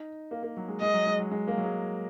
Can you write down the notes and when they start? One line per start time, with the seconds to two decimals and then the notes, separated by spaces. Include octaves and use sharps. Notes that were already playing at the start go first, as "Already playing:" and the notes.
Already playing: D#4
0.31 A#3
0.43 A#3
0.57 F#3
0.68 G#3
0.81 G#3 D#5
0.94 F#3
1.07 G#3
1.19 F#3
1.31 G#3
1.48 A#3
1.58 F#3
1.64 G#3